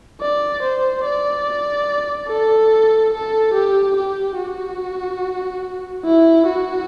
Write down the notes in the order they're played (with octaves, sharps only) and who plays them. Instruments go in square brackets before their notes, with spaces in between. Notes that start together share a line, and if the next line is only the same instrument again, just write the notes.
[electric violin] D5
C5
D5
A4
A4
G4
G4
F#4
E4
F#4